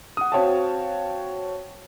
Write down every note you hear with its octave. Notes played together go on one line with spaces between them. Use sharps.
F#5 D#6
C4 F#4 C#5 F5 G5 A5